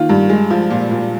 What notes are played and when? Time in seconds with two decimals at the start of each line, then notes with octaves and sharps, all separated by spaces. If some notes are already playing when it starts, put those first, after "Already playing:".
Already playing: D#3 A#3 F4
0.09 G2
0.29 G#3
0.50 F3
0.70 A#2
0.91 A#2